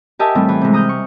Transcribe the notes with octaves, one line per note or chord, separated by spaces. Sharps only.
G4 A#4 D#5 E5 G#5 A5
A2 E3 G3 C4
E3
C3 G#3
A#5 D#6 F6 G6
C#6